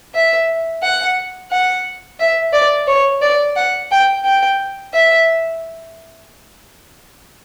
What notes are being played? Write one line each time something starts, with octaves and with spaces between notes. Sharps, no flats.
E5
F#5
F#5
E5
D5
C#5
D5
F#5
G5
G5
E5